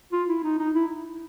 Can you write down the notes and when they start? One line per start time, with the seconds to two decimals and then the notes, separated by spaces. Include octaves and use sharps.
0.12 F4
0.29 E4
0.44 D#4
0.59 D#4
0.75 E4